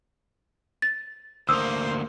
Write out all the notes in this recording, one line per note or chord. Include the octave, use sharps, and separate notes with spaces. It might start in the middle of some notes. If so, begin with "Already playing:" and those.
A6
D2 A#3 A#4 C5 D#6 E6